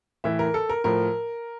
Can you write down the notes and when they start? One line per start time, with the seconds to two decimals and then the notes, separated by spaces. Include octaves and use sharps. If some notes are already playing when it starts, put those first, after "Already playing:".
0.24 A2 E3 E5
0.39 A#4
0.54 A4
0.69 A#4
0.84 A2 F3 A#4